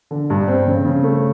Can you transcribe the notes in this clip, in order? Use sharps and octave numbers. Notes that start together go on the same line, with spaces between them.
D3
G2
C4
C#3
C#3
A3